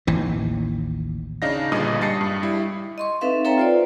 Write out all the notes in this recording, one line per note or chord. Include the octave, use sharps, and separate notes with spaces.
A1 D#2 E3
C#3 D4 D#4 F5 A#6
G1 G2 A#2 G#4 D#5 D#6
G3 D#5 A5 A6 C7 C#7
G2
G3 E4
D#5 C6 C#6
C4 D#4 A4 B4 E5 F5
A4 B4 C#5 E5 G5 A#5
F4 C5 D5